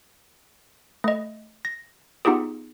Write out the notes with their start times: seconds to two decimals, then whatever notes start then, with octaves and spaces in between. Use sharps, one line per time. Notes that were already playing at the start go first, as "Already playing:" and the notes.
1.04 A3 D#5
1.65 A#6
2.25 B3 D#4 F4 G4 G#4